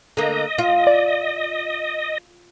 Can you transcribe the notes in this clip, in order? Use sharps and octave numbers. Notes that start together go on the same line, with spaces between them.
D3 A#3 D#5
F4
D5